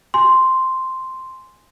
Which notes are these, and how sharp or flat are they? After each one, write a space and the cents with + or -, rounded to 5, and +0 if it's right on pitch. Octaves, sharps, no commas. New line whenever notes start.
G#5 +0 C6 -5